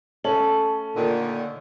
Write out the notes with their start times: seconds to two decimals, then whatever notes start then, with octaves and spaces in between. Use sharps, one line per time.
0.24 A3 C#4 A4 F#7
0.96 A#2 D3 D#3